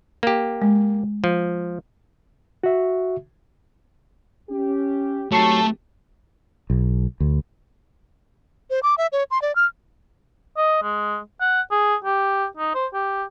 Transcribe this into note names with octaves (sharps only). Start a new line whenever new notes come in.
A#3 G4
G#3
F3
F#4 E5
C#4 G4
G#1 F#3 A3 G4 A5 C#6 C7
B1
D2
C5
D6
E5
C#5
C6
D5
F6
D#5
G#3
F#5
G#4
G4
D#4
C5
G4